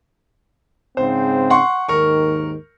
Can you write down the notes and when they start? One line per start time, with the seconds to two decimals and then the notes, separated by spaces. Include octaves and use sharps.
0.97 G#2 C#3 C4 C5
1.50 F#5 C6 C#6
1.89 D#2 G#2 D#3 A#4 C#6